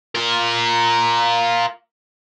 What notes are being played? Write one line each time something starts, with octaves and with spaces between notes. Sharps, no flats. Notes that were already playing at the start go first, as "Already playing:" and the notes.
F4 A#4